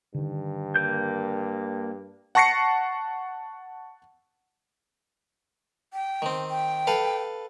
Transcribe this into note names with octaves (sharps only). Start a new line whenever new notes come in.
G2 D3 D#3
A#3 A#4 G6
F#5 A5 C#6 A#6 C7 C#7
G5
D#3 C4
G5
A4 B4 F5